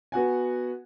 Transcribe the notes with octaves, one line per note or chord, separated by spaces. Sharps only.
B3 F#4 F#5 G#5